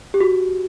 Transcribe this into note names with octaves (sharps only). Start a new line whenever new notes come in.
G4
F#4